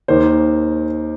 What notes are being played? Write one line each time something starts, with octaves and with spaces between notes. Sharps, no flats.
D#2 D#3 A#3 C5